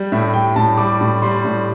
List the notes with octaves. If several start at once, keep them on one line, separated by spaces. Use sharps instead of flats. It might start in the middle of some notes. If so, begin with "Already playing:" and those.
Already playing: G3
A2 E5
G3 G5
A2 A5
G3 D6
A2
G3 C6
A2